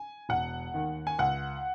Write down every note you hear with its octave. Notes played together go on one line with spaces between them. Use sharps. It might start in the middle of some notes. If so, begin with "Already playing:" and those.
Already playing: G#5
E1 F#5
D#2 D#3
G#5
C#2 F#5